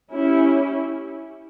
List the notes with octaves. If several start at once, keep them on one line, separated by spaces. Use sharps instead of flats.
C#4 E4 G4